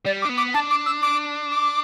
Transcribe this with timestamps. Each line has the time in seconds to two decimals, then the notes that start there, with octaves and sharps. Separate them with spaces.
0.06 G3 D5
0.22 D6
0.25 D4
0.29 B3
0.38 D6
0.54 D4 A5
0.71 D6
0.86 E6
1.03 D6
1.51 D6